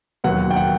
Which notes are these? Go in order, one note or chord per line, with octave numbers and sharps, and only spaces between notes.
E1 D#2 D#3 F#3 B3 F#5
G5
F#5